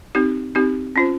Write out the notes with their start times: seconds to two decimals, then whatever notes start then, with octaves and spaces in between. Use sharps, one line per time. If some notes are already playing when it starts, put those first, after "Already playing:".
0.15 C4 D#4 G4
0.55 C4 D#4 G4
0.96 C#4 F4 C5